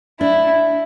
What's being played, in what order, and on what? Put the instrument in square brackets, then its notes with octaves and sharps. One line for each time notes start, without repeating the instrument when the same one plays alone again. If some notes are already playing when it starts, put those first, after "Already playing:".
[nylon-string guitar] D4 [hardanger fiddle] E4